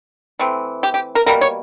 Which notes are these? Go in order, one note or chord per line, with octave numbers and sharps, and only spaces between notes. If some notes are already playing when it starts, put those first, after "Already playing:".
E3 A3 C4
G4
G4
A#4
B2 G3 A#3 A#4
C#5